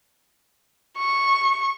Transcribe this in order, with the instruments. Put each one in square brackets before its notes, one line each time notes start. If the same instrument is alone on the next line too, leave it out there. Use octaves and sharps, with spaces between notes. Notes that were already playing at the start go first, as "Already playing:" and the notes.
[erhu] C#6